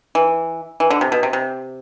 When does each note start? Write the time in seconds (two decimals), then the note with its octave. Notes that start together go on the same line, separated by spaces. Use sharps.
0.15 E3
0.80 E3
0.90 D3
1.01 C3
1.12 B2
1.23 C3
1.33 C3